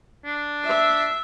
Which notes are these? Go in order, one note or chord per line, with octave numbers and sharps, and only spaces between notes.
D4
E5